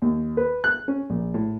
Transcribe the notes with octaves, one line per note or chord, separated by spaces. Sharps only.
D#2
B4
F#6
C#4
A#1
A2